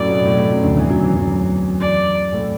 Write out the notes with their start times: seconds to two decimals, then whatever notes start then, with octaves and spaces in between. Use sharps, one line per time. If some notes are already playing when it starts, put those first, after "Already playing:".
Already playing: F#2 A2 F#3 A3 D5
0.08 B2 B3
0.25 A2 A3
0.38 A2 A3
0.51 F#2 F#3
0.64 D2 D3
0.77 E2 E3
0.90 F#2 F#3
1.03 E2 E3
1.16 F#2 F#3
1.81 D5
2.32 A2 A3